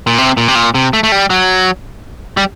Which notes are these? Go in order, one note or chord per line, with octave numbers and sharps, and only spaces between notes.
A#2
C3
A#2
C3
A#2
C3
A3
A3
G3
F#3
G3